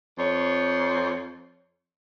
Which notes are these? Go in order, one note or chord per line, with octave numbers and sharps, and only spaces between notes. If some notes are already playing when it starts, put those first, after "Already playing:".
F2 C5 C#5